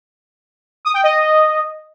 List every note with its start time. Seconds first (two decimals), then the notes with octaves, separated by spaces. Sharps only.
0.85 D#6
0.94 G5
1.03 D#5